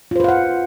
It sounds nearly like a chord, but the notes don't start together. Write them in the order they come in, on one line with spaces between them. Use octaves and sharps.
F4 C5 B4 F5 F#5